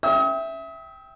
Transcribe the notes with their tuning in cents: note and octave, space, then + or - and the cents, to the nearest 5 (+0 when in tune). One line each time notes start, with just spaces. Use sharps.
E5 +0 G5 +0 D#6 +40